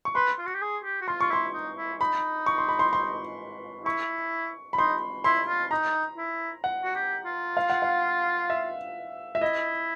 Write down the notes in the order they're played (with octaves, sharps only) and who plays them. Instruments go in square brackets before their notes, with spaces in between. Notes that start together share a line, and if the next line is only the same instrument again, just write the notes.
[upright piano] C#6
[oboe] B4 [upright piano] C6
[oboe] F4
F#4
G4
G#4
G4
F#4
[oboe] F4 [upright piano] C6
[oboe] F4 [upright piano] C#6
[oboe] E4 [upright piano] C6
[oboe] D#4
E4
[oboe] D#4 [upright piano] B5
[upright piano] C#6
C6
B5
C6
C6
[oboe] E4 [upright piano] C#6
[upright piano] B5
[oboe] D#4 [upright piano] C6
[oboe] E4 [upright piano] C6
[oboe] F4
[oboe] D#4 [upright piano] A#5
[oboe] E4
[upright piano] F#5
[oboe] F#4
G4
F4
[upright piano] F5
F#5
F5
E5
E5
[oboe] E4 [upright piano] D#5